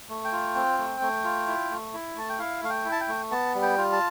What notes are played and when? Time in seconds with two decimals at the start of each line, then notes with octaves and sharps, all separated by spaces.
0.09 A3
0.25 G5
0.32 F4
0.55 C4
0.78 A3
1.01 A3
1.24 F4
1.47 E4
1.70 A3
1.93 E4
2.16 A3 A5
2.29 G5
2.39 E4 F5
2.62 A3 F5
2.70 G5
2.85 E4
2.92 A5
3.01 G5
3.08 A3
3.31 B3 A5
3.55 G3
3.62 G5
3.78 F4
3.92 A5